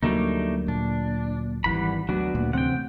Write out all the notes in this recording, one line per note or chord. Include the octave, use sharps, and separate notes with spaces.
D2 D3 F#3 G3 A3 A#3 D#4
A#2 D4
G#1 E3 G3 F#5 B5
D2 F#3 B3 D4 F#4
D2 A#2
A1 C3 C4 F#5 G5